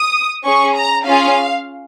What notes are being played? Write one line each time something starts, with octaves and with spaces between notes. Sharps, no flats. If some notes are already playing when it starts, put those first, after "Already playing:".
Already playing: D#6
C#4 G#4 C#6
A#5
C#4 F4 G#4 F5